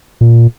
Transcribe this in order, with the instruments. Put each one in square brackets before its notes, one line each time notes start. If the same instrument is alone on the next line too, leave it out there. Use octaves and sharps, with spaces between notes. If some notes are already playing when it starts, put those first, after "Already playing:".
[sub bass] A#2